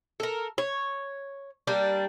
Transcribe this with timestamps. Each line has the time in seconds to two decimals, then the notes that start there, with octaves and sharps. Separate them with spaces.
0.20 A4 A#4
0.58 C#5
1.67 G3 A#3 D4